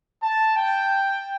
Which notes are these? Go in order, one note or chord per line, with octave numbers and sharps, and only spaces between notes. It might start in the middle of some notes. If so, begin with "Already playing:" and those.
A5
G5